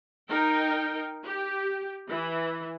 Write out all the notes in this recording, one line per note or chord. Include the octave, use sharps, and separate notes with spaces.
D#4 A#4 G5
G4
E3